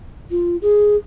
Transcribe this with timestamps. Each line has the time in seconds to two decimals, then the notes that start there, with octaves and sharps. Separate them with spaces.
0.31 F4
0.62 G#4